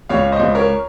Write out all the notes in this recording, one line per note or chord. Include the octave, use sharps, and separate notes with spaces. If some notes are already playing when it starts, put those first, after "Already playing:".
C#2 C#5 F5
C5 D#5
C#2
A#4 C#5